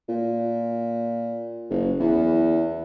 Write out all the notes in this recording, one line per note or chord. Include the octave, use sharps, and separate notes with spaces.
A#2
F#1
E2